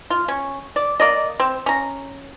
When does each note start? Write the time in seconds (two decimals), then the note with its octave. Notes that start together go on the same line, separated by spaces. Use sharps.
0.10 F4
0.28 C#4
0.76 D5
1.00 A#3 D5 D#5
1.40 C4
1.66 C#4 A#5